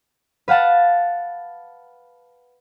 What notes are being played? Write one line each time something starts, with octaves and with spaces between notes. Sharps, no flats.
B4 F5 F#5 A5